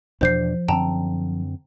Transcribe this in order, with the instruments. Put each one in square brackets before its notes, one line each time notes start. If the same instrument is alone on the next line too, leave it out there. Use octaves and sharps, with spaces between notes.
[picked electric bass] E2 B2 D4 [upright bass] F3 [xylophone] C5 G6 C7
[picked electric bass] F#2 D3 C4 [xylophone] G5 A5 A#5